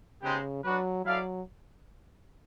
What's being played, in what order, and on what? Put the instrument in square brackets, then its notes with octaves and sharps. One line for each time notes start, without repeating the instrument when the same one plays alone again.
[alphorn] C#3 [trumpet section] G#3 B3 D#4 G4 C5
[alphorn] F#3 [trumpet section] D4 F#4 B4
[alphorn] F#3 [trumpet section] E4 A4 D5 F5